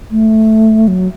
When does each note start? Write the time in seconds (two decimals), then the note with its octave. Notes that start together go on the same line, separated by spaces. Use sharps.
0.11 A3
0.88 F#3